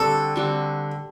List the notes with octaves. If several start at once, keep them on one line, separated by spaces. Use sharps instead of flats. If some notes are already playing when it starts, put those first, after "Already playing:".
Already playing: D3 G3 C4 F#4 A4
D3 G3 C4 F#4